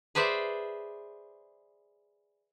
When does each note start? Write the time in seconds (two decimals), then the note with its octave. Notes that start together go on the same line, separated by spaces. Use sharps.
0.15 G#4 B4 C5 D5 E5